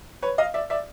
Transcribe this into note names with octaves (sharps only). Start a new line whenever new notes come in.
B4 C#5
D#5 F5
D5 E5
D5 E5